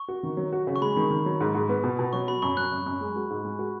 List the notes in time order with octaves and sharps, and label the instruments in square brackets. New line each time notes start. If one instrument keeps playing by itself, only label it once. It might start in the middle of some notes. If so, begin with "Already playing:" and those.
Already playing: [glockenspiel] C#6
[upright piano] F#4
D#3
F#3
F#4
C#3
[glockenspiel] C#6
[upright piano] G#3 [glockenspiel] B5
[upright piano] D#3
D#3
F#3
G#2
G#2
B3
B2
B2
[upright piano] F#3 [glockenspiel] C#6
[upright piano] F#4 [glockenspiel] B5
[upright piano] F#2 [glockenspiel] C#6
[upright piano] F#3 [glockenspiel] F#6
[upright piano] F#2
F#2
G#3
F#4
G#2
G#3
F#4